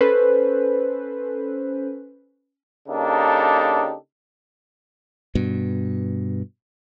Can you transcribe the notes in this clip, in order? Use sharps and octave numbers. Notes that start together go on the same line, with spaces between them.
C#4 A4 B4 C5
C#3 A#3 D4 D#4 G4 A4
G2 B2